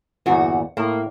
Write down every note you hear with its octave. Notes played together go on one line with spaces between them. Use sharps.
G1 E2 A#2 F#4
A2 A#3